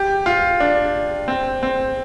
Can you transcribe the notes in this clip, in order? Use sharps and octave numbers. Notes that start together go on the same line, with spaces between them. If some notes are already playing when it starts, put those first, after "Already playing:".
Already playing: G4
F4
D4
C4
C4